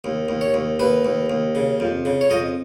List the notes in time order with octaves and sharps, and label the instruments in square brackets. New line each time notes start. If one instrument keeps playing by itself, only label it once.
[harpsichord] D#2
D#2
C#5
D#2
D#2 B4
D#2
D#2
C#3
F2
C#3
C#5
F2 D#5